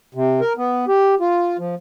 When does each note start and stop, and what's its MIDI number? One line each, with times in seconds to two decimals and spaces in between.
0.14 0.40 48
0.40 0.53 70
0.57 0.85 59
0.88 1.15 67
1.20 1.57 65
1.59 1.75 53